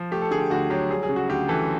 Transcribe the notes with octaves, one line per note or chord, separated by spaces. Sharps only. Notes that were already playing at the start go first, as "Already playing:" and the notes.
Already playing: F3
A3 G4
A4
D3 G#4
G4
D2 F#4
F#3 G4
G3 G#4
G#4
C#3
F#4
D2 G4
E3 A4